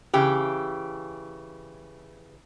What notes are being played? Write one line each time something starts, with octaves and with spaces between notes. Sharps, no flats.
C#3 E3 G4